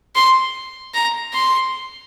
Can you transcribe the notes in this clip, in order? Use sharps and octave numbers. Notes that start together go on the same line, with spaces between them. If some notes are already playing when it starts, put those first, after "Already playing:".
C6
A#5
C6